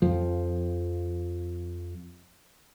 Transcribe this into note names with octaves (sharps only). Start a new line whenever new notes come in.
F2 F3